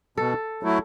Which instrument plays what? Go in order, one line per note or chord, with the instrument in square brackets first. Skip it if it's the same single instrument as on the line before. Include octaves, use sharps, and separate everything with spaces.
[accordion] B2 [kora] A4
[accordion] F#3 A3 E4